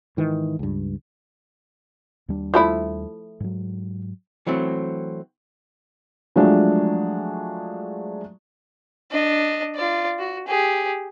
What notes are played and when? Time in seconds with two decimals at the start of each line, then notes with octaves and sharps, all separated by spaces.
0.17 G#2 D#3 E3
0.59 C#2 G2
2.28 D#2 G3 D4
2.54 F3 A3 E4
3.40 G#2 F#3
4.47 E3 F#3 A3 C4
6.36 F3 F#3 G#3 A3 D4
9.12 D4 D#5
9.76 F4 D5
10.19 F#4
10.47 G4 G#4